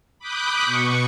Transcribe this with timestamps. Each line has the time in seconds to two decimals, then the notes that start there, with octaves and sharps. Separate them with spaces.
0.19 B5 D6 D#6 F#6 G6
0.65 B2 C#6 C#7